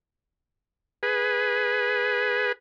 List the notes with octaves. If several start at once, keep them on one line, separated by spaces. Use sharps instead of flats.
G#4 B4